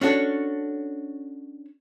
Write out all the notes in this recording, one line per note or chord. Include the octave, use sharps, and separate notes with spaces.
C#4 D4 F#4 A4 C#5